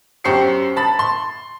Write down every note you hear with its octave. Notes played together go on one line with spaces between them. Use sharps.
F#2 G4 C5 C#6 C7 C#7
A5 B5 A6
C6